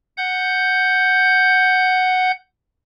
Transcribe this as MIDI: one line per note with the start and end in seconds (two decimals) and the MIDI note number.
0.17 2.31 78
0.17 2.31 91